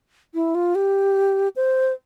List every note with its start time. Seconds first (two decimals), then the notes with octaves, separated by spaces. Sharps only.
0.34 E4
0.55 F4
0.75 G4
1.56 C5